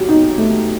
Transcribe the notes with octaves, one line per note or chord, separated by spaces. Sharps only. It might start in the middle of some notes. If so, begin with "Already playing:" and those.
Already playing: F#3 G4
D#4
A3